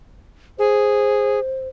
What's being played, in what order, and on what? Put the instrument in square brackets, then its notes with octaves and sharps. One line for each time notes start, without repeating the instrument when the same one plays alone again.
[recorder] G#4 [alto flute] C5